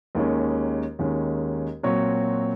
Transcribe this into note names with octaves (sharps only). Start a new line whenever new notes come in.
D#2 D#3 G#3 C#4
D#2 D#3 G#3 C#4
A#2 F#3 C4 F#4 C#5